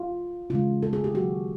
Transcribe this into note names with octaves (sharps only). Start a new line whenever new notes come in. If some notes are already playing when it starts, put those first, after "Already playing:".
Already playing: F4
C#3 E3 G#3 F4
A4
G#4
G4
D#3 F#3 A#3 F#4